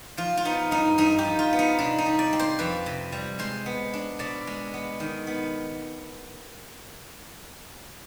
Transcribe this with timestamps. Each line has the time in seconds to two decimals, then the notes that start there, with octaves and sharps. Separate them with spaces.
0.17 F3 F4
0.37 F4
0.45 B3 D#4
0.71 G2 D#4
0.98 G2 D#4
1.19 G4
1.25 F3
1.39 F4
1.53 B3
1.59 D#4
1.79 C3 D4
1.98 D#4
2.06 G3
2.19 D5
2.33 C4
2.39 C5
2.59 F2 B4
2.86 C3
3.12 G3
3.39 G#3 C5
3.66 B3
3.93 D4
4.19 B2 D5
4.47 G#3
4.74 B3
5.00 D#3
5.27 B3